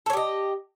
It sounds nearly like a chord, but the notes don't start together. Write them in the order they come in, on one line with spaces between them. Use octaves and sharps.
A4 C#5 G4 D#5